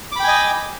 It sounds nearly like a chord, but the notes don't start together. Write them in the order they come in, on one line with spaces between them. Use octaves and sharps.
D6 B5 G5 G#5 D#5